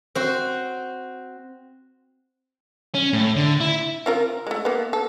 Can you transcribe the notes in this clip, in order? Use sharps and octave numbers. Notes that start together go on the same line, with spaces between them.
C4 F#4 C5
C#4
A2
D3
E4
C4 F4 A#4
G#3 A3
A#3 B3
A4